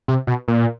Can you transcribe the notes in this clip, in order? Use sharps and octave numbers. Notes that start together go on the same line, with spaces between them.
C3
B2
A#2